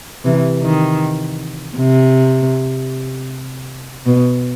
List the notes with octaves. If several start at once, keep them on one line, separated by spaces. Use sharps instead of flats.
C3 E3
D#3
C3
B2